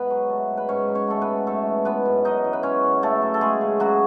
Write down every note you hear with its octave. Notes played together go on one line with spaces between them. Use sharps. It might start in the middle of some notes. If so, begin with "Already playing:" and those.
Already playing: G#2 B3 B4
F#3
A3
G#2
B4
G#2 C#4 C#5
F#3
C#4 C#5
A3 A4
B3 B4
G#2
F#2 A3 A4
E3
G#3 B3 B4
F#2
F#2 D#4 D#5
E3
B4
G#3 C#4 C#5
F#2
C#3 A3 A4
F#3
A4
G#3 A3 G#4
C#3
C#3 F#3 F#4